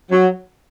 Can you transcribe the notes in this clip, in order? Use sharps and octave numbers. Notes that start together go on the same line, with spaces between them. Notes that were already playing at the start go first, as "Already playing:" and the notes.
F#3